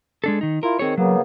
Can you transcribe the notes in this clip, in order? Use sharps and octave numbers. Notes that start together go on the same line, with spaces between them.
G#3 D4 A4
D#3 D#4
E4 F4 A#4
D#3 C4 G#4 C#5
C#3 F#3 A#3 B3